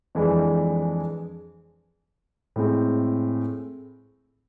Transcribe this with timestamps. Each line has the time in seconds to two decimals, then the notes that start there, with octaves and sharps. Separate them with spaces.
0.15 F2 E3 G#3 D4
2.56 A2 G#3 C4